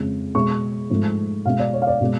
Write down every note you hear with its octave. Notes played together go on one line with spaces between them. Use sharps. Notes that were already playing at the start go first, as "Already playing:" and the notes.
Already playing: F2 C#3 G#3
B2 G#3 C#6
G#2 F3 A3
B2 G#3 F5
D5
C#5
F5
D5
B2 G#3